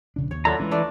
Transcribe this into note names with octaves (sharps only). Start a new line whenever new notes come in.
A#1 C#3 D4
D#2 C#5
F#3 D4 E4 F4 A4 A#5
E3 G#3 C#4
A3 D4 D5